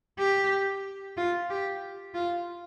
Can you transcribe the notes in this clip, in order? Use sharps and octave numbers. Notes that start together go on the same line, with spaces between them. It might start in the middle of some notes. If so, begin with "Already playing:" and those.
G4
F4
G4
F4